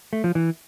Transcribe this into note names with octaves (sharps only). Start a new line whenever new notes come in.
A3
F3
E3